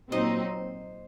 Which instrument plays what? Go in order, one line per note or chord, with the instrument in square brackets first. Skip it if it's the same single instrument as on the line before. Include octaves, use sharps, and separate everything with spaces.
[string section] A#2 F#3 C4 D#4 [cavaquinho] C5 D#5